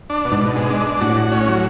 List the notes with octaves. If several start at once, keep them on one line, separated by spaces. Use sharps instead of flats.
D4
B2
G#2
B2
G#3
D4
D4
A2 F#4
F#4
C#4
F#3